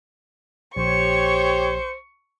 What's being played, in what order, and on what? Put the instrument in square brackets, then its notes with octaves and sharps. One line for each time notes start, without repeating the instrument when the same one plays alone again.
[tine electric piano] A#1 [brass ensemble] G4 C#5 [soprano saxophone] C5 [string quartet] C#6